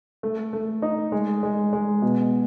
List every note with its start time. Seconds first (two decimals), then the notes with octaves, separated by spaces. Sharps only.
0.23 A3
0.53 A3
0.82 D#4
1.12 G#3
1.43 G#3
1.73 G#3
2.02 B2